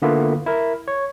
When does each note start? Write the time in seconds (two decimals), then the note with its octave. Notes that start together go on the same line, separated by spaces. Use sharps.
0.02 D3 A#3 B3 E4 F4 A4
0.46 E4 A#4
0.88 C#5